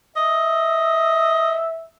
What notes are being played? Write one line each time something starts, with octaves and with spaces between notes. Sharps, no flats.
D#5 E5